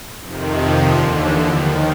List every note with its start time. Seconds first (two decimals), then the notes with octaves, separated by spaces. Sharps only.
0.22 F2 C3 D#3
0.53 F3
0.84 D#2 D3
1.15 E3
1.46 D#2 D#3 F3